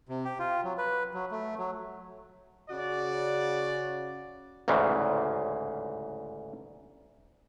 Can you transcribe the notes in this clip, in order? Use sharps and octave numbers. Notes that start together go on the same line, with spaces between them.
C3
G4
F4
F#3
B4
F#3
A3
F#3
C#3 F#4 D5
A1 D2 G#2 C#3 E3